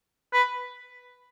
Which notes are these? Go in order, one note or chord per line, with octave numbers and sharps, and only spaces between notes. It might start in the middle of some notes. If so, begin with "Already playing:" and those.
B4